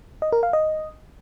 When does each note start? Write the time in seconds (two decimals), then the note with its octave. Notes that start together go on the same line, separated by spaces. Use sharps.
0.22 D#5
0.32 A#4
0.43 F5
0.53 D#5